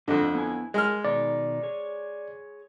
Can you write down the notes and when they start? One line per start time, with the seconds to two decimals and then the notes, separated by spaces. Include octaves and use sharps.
0.08 F2 G#2 D3 D#5
0.35 B3 E4 G#5
0.74 G#3 G#4 A#4 G#5 F6
1.05 B2 D#3 D#4 D5
1.63 G#4 C#5